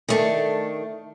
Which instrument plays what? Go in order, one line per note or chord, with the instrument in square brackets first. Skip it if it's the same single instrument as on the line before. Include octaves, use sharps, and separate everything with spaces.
[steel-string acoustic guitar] D#3 A3 D4